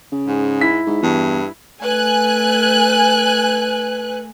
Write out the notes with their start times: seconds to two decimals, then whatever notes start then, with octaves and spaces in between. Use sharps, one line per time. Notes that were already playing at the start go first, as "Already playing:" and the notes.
0.12 C#3
0.28 G#2
0.61 E4 B6
0.87 G#2
1.03 E2 G2
1.83 A3 B4 G#5 F#6